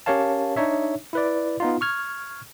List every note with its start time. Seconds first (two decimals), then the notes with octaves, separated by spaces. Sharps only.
0.06 C#4 G4 A#4 C#5 F5 A5
0.56 D4 D#4 C#5 E5
1.13 E4 B4 D5
1.60 B3 D#4 F4
1.81 C#6 F6 G#6